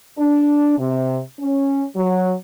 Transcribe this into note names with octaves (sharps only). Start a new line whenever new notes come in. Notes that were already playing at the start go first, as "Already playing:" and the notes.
D4
C3
C#4
F#3